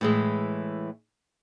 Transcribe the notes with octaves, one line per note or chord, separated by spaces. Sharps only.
A2 E3 G#3